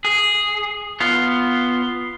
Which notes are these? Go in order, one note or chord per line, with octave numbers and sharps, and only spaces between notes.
G#4
B3 F4